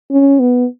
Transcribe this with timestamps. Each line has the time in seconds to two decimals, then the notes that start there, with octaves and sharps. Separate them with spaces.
0.11 C#4
0.40 B3